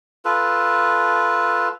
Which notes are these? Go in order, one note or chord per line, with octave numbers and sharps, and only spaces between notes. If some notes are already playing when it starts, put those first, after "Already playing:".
F4 A4 B4